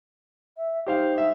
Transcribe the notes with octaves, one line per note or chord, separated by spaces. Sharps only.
E5
D#4 G4 C5 F5
E5